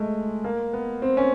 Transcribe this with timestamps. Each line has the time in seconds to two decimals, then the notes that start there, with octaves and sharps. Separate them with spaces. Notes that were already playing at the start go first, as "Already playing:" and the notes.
Already playing: G#3 A3
0.44 A#3
0.73 B3
1.02 C4
1.17 C#4